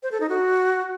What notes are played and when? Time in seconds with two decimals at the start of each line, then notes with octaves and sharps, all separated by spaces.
0.03 C5
0.12 A4
0.20 D#4
0.29 F#4